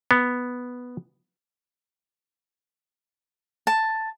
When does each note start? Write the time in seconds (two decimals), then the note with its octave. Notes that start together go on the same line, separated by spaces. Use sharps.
0.11 B3
3.67 A5